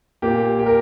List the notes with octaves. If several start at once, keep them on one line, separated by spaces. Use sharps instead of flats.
A#2 A#3 G4
G4
A#4